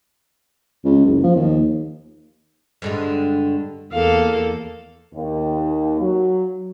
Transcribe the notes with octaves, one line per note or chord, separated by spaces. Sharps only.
C#2
F#1
F3
D#2
G2 D3 G#3
E2 A#3 A4 F5
D#2
F#3